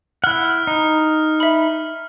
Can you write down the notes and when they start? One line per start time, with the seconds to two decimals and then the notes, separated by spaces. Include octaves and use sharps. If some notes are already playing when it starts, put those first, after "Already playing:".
0.24 E4 F#5 F6
0.67 D#4
1.40 E5 B5